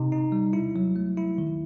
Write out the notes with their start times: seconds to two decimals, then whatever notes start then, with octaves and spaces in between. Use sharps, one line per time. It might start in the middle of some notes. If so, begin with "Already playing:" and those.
Already playing: C3 D#4
0.12 D#4
0.32 G3
0.53 E4
0.76 F#3
0.96 A3
1.17 E4
1.38 D#3